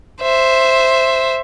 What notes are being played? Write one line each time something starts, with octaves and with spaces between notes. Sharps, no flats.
C5 E5